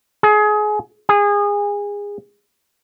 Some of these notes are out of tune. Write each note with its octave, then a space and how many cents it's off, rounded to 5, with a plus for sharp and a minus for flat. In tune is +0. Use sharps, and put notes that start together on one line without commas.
G#4 +25
G#4 -25